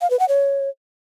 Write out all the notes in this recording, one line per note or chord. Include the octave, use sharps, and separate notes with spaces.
F5
B4
F#5
C#5